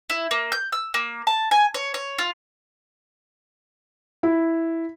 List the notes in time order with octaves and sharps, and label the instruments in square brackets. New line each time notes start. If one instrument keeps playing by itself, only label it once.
[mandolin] E4
A#3
G6
E6
A#3
A5
G#5
C#5
C#5
F4
[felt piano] E4